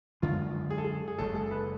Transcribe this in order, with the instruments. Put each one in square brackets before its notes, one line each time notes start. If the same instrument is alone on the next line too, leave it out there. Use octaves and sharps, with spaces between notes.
[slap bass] F#2 D3 G#3 D4 [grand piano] F4
[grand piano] G#4
A4
G#4
G#4
[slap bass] F#1 F#2 C#3 G#3 [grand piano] A4
[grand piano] A4
B4